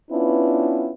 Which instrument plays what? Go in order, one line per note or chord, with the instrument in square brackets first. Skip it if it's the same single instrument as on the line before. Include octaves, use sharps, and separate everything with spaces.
[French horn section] B3 C#4 D4 E4 F4 B4